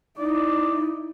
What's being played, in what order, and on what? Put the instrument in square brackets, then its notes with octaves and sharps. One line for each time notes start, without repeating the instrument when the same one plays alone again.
[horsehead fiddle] D#4 E4 [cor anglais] D5